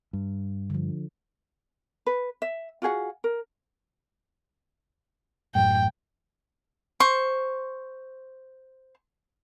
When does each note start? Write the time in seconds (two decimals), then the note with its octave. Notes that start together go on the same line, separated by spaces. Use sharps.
0.13 G2
0.70 D3 F3
2.07 B4
2.42 E5
2.82 F4 F#4 G#4 F#5
3.24 A#4
5.55 A1 F#2 A2 G5
7.00 C5 C#6